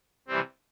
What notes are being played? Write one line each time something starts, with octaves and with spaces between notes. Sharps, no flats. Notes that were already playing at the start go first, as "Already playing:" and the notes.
C3 E3 G3 C4